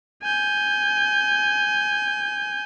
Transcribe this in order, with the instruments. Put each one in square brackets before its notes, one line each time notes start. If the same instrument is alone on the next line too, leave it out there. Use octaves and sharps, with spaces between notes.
[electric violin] G#5 G6